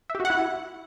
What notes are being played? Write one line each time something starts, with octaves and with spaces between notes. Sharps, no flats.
E5
G4
F#4
F#5
E4